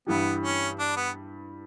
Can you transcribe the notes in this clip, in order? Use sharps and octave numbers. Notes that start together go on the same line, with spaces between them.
G2 E3 G3 B3
C#4
D4
B3